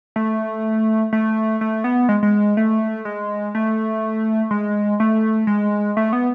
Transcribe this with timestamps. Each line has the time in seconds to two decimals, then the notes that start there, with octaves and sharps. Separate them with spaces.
0.16 A3
1.13 A3
1.61 A3
1.84 B3
2.09 G#3
2.23 G#3
2.57 A3
3.05 G#3
3.55 A3
4.51 G#3
5.00 A3
5.47 G#3
5.97 A3
6.13 B3